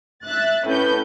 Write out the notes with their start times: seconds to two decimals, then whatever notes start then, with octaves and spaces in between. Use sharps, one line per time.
0.25 E5 F#6 A6
0.66 A2 C#4 B4 G6